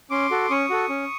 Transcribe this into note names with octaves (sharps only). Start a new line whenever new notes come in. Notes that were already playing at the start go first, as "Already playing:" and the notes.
C#4 C6 D6
F#4 A4
C#4 C#6 D#6
F#4 A4
C#4